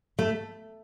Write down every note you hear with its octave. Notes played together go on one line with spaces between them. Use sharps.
A3